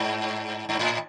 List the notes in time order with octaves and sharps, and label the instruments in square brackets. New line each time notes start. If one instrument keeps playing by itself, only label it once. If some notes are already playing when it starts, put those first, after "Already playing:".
Already playing: [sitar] G#2
G#2
A2